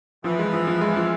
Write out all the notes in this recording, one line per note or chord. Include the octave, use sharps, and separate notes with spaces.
E3 F3
G#3
F3
F3
G#3
F3